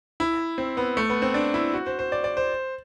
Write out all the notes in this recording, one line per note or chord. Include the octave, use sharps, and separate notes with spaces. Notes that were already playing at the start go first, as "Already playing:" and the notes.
E4
C4
B3
A3
B3
C4
D4
E4
F#4
C5
C5
D5
D5
C5